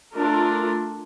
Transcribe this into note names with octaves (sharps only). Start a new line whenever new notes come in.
A3 D4 F4 A#4